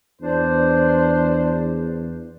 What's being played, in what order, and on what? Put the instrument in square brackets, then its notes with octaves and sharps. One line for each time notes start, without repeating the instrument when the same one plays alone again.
[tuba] E2 [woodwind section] D4 C5